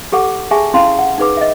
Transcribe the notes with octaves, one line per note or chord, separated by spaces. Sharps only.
G4 A4 F#5 D6
G#4 E5 G#5 A5 C#6
C#4 E4 F5 C6
F#5
D#4 G#4 B4 D6
D#5 E5